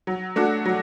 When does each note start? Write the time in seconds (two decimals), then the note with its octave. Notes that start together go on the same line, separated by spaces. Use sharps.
0.07 F#3
0.36 A3 D4 F#4
0.65 F#3